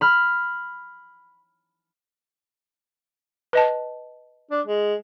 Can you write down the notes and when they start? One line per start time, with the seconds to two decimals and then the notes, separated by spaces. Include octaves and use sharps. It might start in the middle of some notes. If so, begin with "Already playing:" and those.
0.01 B5 F6
3.53 B4 D#5 A5
4.51 D4
4.67 G#3